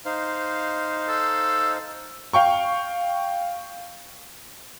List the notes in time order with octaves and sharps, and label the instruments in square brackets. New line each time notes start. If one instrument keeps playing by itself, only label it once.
[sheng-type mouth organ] D#4 C5 F5
[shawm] A4
[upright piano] F5 G5 C#6